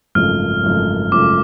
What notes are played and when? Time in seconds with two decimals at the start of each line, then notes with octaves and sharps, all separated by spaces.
0.15 G#1 F#2 C#3 F3 A3 F6
0.64 G#1 F#2 C#3 F3 A3
1.12 G#1 F#2 C#3 F3 A3 D6